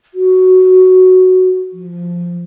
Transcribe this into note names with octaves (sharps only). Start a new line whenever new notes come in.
F#4
F3